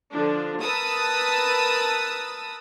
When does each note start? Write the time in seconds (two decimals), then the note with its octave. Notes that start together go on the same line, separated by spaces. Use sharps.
0.13 D3 F3 D4
0.62 A#4 B4 A5 D#6 E6